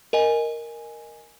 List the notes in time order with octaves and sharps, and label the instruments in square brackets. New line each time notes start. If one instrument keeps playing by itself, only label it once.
[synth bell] A#4 D#5 G#5